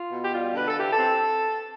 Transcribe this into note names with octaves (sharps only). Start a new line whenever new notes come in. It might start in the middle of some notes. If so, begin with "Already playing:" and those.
Already playing: F4
B2
G4
G3 F4
D3 B4
A4
E3 G4
A4
C4